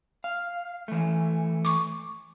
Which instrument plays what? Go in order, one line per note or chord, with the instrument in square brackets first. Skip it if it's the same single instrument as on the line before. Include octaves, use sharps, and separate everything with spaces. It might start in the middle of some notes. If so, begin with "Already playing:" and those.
[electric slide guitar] F5
E3 A3
[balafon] C#6 D6